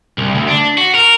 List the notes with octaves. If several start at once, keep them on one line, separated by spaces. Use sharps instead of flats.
C2
D2
D4
F#4
A#4